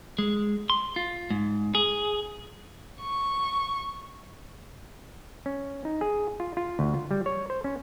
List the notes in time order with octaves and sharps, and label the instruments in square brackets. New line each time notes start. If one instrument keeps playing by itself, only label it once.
[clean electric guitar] G#3
C6
F4
G#2
G#4
[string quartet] C#6
[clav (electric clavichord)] C#4
D#4
G#4
F4
F4
D2
F4
G3
C#5
C5
C#4